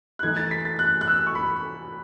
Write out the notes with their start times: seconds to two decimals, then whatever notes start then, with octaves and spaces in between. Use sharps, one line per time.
0.19 F#6
0.23 E3 A3 D#4 G#6
0.37 A6
0.51 B6
0.65 A6
0.79 F#6
1.01 F#6
1.08 E6
1.27 C#6
1.35 B5